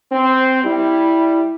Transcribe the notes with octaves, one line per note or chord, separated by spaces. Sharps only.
C4
G3 E4